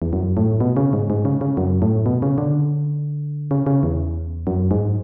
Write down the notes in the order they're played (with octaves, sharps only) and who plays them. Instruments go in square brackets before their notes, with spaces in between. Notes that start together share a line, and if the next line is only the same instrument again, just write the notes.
[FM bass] E2
F#2
A2
B2
C#3
G#2
G#2
C#3
C#3
F#2
A2
B2
C#3
D3
C#3
C#3
E2
F#2
G#2